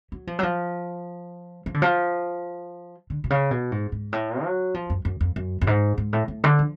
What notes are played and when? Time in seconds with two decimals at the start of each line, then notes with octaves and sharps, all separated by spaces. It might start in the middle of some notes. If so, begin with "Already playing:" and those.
0.12 F#3
0.27 F3
0.39 F#3
0.43 F3
1.66 F3
1.74 D3
1.82 F3
3.10 D3
3.24 B2
3.30 C#3
3.51 B2
3.72 G#2
3.92 G#2
4.13 A2
4.43 F#3
4.74 F3
4.90 F#2
5.05 F#2
5.21 F2
5.36 F#2
5.61 F#2
5.67 G#2
5.98 G#2
6.13 A2
6.28 A2
6.44 D3
6.59 F3